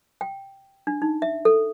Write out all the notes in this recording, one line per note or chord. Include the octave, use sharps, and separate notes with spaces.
G5
D4
D#4
E5
A4